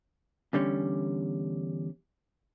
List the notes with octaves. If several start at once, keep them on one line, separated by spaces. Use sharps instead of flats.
E2 D3 G3 C#4